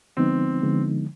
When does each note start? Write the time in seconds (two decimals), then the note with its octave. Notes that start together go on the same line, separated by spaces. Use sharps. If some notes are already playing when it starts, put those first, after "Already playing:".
0.17 D3 F3 G#3 B3 C4 D#4
0.62 D3 F3 G#3 B3 D#4